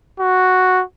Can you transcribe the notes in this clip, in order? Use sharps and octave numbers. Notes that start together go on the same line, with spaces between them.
F#4